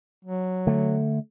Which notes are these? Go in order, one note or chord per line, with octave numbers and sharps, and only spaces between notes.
F#3
D3 A3